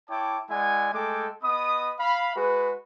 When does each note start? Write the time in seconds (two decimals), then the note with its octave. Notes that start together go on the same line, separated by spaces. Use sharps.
0.10 E4 C#5 G5 A5 D6
0.50 G#3 E4 D5 F#5 G#5
0.94 G#3 A3 A4 G5 G#5 D6
1.43 B3 D#5 B5 D#6
2.00 F5 B5
2.37 G#3 F#4 G#4 B4